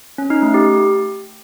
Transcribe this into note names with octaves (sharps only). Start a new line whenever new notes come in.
C#4
D#4
A3
G4